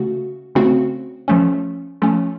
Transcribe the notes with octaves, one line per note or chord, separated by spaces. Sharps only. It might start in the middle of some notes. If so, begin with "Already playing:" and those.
Already playing: C#3 A3 F#4
C#3 A3 C4 F#4
F3 A3 C#4
F3 A3 C#4